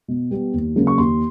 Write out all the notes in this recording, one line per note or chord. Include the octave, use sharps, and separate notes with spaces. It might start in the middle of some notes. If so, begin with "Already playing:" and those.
B2
G3 B3
D#2
C#3 F#3 A#3
C#6
D#2 C6